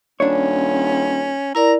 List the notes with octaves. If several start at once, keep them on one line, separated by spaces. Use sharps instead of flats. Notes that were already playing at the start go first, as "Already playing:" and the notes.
D#1 C#4 D4 C#5
E4 A#4 D5 A#5